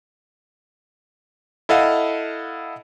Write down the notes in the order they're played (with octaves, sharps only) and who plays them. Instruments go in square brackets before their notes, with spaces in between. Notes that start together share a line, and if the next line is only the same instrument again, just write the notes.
[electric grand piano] E4 A4 D#5 F5 F#5